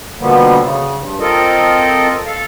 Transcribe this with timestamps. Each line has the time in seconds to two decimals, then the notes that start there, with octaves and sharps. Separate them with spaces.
0.19 B2 D3 F3 G3 A#3 B3
0.60 C#3
0.96 G2
1.20 C4 F4 A4 A#4 D#5
2.27 A4 F5